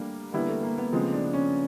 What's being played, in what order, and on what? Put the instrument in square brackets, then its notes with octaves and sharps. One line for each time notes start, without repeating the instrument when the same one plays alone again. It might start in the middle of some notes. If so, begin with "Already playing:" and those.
Already playing: [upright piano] G3 A#3 D4 [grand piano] A3
[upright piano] D3 G3 B3 E4 [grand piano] A#3
[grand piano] A3
A#3
B3
[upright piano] C#3 F3 G#3 [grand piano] C4
[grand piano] D4
C#4